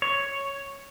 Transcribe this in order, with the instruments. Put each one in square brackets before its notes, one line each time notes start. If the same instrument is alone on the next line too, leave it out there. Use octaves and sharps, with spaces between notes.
[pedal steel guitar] C#5